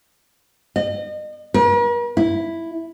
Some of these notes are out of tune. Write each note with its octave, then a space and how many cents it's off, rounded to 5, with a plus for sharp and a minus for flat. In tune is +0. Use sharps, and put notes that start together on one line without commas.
D#5 -35
A#4 +45
E4 +0